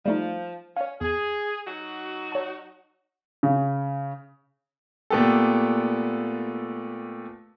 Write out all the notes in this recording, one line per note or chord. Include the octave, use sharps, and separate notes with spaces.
F3 G3 A3 D#4
C#4 C#5 F5
E2 G#4
F#3 D#4 F#4
C#5 A5
C#3
A#2 A3 B3 G4 A4